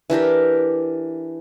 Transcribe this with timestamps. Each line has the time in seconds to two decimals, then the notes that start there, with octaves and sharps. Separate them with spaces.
0.10 E3 D4 G4 A#4